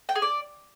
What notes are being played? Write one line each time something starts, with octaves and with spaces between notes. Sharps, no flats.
G5
G#4
D5